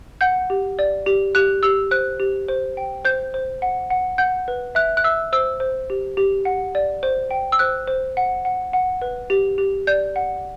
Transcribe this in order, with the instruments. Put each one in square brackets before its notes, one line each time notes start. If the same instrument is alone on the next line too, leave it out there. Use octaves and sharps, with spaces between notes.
[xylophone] F#5 G6
G4
D5
G4
G4 F#6
G4 E6
C5 F#6
G4
C5
G5
C5 G6
C5
F#5
F#5
F#5 G6
B4
E5 F#6
F#6
E5 E6
C5 E6
C5
G4
G4
F#5
D5
C5
G5
E6
C5 F#6
C5
F#5
F#5
F#5
B4
G4
G4
D5 G6
F#5